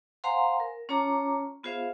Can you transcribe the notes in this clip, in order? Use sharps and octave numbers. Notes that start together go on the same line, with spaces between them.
C5 F5 F#5 G#5 A#5 C6
A#4
C#4 F4 C#5 A5 A#5 D6
B3 F4 G#4 C5 E5 F5